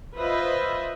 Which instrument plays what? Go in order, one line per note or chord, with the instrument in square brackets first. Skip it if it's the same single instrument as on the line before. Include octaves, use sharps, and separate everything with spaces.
[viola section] F4 B4 C5 D#5 E5